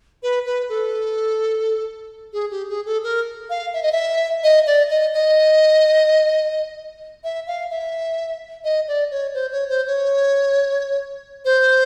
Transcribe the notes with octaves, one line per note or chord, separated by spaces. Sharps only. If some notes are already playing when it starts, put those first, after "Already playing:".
B4
B4
A4
G#4
G4
G#4
A4
A#4
F5
E5
D#5
E5
D#5
D5
D#5
D#5
E5
F5
E5
D#5
D5
C#5
C5
C#5
C5
C#5
C5